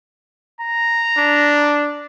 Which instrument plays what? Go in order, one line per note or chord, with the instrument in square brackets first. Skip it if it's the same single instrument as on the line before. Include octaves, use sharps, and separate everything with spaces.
[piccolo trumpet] A#5
[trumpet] D4